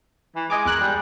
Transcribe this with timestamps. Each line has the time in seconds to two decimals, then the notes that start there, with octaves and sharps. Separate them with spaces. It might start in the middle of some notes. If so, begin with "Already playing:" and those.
0.35 E3
0.50 G#3 D#5 G#5 D6
0.66 E2 G#3 A#4 F#6
0.80 G3